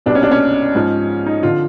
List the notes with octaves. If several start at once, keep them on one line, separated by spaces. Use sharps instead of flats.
C2 B2 D4
C#4
D4
C#4
G#2 F3
D#4
D3 F3 F4